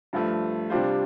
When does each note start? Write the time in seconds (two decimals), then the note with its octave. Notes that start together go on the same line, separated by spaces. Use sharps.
0.13 G2 F3 A3
0.70 C3 G3 D4 F4 C5